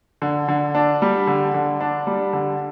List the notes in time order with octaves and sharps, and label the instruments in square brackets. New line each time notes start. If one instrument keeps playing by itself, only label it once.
[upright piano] D3
D3
D4
G3
D3
D3
D4
G3
D3